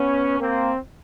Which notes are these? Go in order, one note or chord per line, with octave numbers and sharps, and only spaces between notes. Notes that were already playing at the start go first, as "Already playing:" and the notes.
Already playing: B3 C#4
A#3 C4